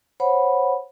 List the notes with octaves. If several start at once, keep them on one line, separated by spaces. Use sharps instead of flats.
C5 C#5 F#5 B5